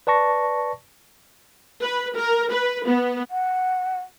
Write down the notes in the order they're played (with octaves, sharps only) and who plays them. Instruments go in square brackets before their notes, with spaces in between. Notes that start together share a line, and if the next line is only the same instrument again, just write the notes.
[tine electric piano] B4 D5 A5 C#6 A#6
[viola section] B4
A#4
B4
B3
[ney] F#5